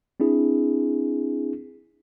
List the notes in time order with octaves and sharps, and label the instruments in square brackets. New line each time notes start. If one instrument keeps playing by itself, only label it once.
[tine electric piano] C4 D4 E4 G#4